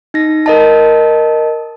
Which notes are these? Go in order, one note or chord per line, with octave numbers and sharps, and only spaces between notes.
D#4 A#6
A#4 D#5 A5